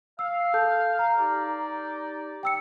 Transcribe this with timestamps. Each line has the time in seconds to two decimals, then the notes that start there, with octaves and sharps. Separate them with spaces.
0.19 F5 E6
0.54 A4 A5 G6
0.99 A#5
1.17 D#4 G4 D5
2.43 G5 E6 C#7